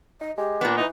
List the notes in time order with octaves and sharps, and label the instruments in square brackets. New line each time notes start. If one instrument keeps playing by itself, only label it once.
[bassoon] D#4 [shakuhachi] D#5
[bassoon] G#3 [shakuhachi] G4
[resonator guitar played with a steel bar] A#2 B3 [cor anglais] D4
[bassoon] E3 [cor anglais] D#4 [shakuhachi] B4